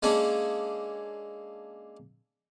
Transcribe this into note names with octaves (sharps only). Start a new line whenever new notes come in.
G#3 A#3 C#4 D4 G#4 A4